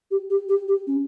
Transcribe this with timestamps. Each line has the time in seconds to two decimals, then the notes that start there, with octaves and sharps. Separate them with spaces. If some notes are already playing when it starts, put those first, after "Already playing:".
0.11 G4
0.30 G4
0.49 G4
0.68 G4
0.87 C#4